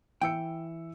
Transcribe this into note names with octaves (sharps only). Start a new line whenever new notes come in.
E3 G5 E6 C#7